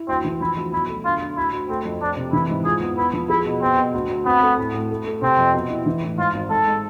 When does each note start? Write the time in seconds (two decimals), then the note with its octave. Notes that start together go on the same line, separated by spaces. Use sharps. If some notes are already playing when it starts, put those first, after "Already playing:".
Already playing: E4
0.08 D2 C4
0.25 E3
0.41 F3 E4
0.57 D2
0.73 B1 E4
0.89 A3
1.05 D3 F4
1.21 D3
1.37 D2 E4
1.53 D2
1.69 A3 C4
1.85 F2
2.01 F2 D4
2.17 C3
2.33 E3 E4
2.50 G#2
2.65 F4 G#4
2.81 E2
2.97 B3 E4
3.13 F3
3.29 E4 G#4
3.46 B2
3.61 B3 C4
3.78 B2
3.94 D2
4.10 D2
4.26 B3 C4
4.42 A3
4.58 A2
4.74 A2
4.90 A3
5.06 A3
5.22 C3 C4
5.38 F2
5.54 B2
5.70 E4
5.86 E3
6.03 A2
6.18 G#2 F4
6.34 G#1
6.50 G#2 A4
6.66 G#3